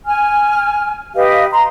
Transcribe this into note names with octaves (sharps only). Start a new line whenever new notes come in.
G#5 F6
G4 B4 D#5 F5
A#5 C6